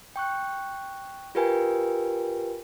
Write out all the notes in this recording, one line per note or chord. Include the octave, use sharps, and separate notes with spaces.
G5 C#6 F#6
F4 G4 A#4 B4 G5 G#5